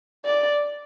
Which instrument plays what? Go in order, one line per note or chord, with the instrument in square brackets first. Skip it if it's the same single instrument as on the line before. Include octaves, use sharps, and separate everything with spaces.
[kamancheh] D5